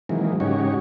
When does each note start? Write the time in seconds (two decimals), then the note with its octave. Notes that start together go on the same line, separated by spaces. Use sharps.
0.09 C3 D#3 E3 F#3 G#3 A#3
0.40 G#2 C#3 D#4 F#4 G4 C#5